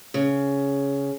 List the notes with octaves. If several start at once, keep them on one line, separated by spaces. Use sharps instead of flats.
C#3